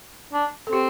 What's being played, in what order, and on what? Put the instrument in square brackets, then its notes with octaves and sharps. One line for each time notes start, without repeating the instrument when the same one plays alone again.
[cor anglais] D4
[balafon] A4
[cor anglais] C4 [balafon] G4